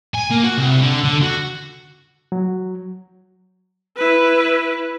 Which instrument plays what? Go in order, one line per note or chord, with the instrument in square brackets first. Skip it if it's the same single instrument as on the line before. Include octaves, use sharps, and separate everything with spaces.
[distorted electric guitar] G#5
A#3
F#4
C2
D3
D3
F#4
[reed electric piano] F#3
[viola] E4 B4